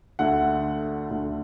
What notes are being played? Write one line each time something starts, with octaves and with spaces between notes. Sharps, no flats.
D2 D3 A3 F#5
D2 D3 A3